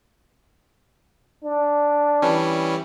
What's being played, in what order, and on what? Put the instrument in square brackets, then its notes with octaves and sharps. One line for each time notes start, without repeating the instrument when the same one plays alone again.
[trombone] D4
[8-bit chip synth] E3 G3 C#4